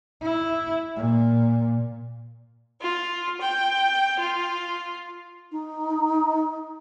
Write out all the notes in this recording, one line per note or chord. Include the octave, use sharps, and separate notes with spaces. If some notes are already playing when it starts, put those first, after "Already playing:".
E4
A#2
F4
G5
F4
D#4